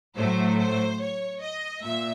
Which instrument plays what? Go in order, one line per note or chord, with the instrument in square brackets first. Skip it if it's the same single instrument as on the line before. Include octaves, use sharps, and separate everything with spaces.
[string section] A2 F#3 A3 C5
C5
C#5
D#5
A#2 E5